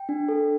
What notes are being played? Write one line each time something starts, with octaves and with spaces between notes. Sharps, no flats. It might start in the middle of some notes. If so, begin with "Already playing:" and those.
Already playing: G5
D4
A4